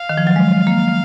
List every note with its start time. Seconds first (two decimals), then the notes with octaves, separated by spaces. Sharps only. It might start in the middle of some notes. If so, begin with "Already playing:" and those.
Already playing: F5
0.09 D#3
0.17 F3
0.27 F#3
0.36 G#3
0.67 A#3